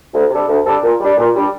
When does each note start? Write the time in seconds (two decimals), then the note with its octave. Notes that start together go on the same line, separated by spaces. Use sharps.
0.13 D2
0.30 C3 G3 D4 A4
0.48 D2
0.65 C3 G3 D4 A4
0.83 A#2
1.00 G3 D4
1.17 A#2
1.35 G3 D4